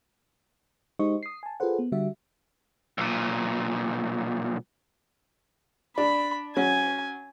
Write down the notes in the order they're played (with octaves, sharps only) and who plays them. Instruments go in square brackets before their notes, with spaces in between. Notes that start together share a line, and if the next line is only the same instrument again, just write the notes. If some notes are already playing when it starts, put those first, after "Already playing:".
[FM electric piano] G#3 D#4 G4 C5 D#5 C#6
D#6 C7
G#5 A5
F4 G#4 A4 B4 C5 F#5
B3
D3 G3 F#4 E5
[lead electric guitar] B1 A#2
[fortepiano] D4 [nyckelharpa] B5
[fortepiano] F#3 C#4 [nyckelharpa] G#5